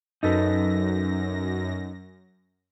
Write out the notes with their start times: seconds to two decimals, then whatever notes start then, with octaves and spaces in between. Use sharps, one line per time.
0.23 F#2 D#4 A4 B4 A#6